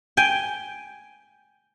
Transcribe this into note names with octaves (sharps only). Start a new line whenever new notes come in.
G5 G#5